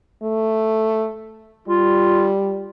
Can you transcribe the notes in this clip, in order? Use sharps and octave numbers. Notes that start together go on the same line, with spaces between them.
A3
G3 F4